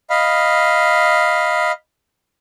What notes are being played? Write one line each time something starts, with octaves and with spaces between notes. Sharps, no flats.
D#5 F5 B5